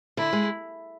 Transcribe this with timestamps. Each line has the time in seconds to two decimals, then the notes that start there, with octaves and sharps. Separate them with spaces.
0.17 D3 E4
0.33 G#3